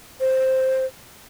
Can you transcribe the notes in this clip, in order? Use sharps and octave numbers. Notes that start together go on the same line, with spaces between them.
C5